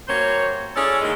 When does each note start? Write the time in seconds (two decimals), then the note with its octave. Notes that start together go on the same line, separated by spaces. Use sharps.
0.08 G3 A#3 F#4 C5 C#5
0.76 C#4 E4 G#4 A4 C#5 D5
1.02 D#3 G#3 A#3